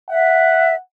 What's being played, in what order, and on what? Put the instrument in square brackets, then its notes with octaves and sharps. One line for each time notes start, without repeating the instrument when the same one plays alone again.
[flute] E5 [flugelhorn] F#5